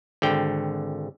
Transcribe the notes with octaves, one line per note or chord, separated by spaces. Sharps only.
G#1 D3 G5